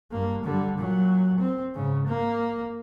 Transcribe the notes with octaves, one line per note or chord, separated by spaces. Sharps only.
G2 A#3
D3 G3
A#2 F#3
C4
G#2 C#3
A#3